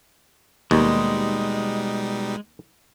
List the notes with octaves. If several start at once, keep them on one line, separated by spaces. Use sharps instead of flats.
D#2 B2 G3 G#3 D#4